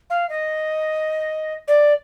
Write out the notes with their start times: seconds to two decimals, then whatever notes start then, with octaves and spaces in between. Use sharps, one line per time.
0.10 F5
0.30 D#5
1.68 D5